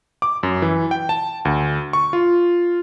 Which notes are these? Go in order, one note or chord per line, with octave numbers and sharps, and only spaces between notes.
D6
F#2
E3
G5
A5
D2
C#6
F4